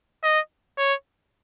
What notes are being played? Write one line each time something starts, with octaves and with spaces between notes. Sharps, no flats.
D#5
C#5